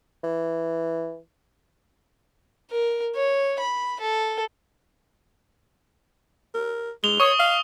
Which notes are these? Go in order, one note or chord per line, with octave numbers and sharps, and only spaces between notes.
E3
A#4
C#5
B5
A4
A#4
G#3 F7 G7
C#5 C#6 D#6
F5